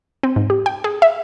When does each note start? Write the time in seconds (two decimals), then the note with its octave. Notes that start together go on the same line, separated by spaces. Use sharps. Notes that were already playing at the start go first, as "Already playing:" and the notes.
0.23 C4
0.36 G#2
0.50 G4
0.66 G5
0.84 G#4
1.02 E5